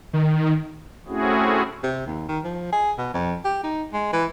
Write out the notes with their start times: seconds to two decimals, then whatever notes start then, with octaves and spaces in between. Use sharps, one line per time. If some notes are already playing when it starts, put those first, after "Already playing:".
0.13 D#3
1.08 A3 C4 C#4 E4 F#4 G#4
1.83 C3
2.06 D#2
2.28 D#3
2.44 F3
2.72 G#4
2.98 B2
3.14 F2
3.45 G4
3.64 D#4
3.93 G#3
4.13 E3